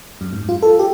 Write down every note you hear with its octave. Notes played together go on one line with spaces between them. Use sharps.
F#2
G#2
F4
A4
G4